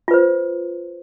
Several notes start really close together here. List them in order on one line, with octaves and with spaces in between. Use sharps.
F4 B4 C5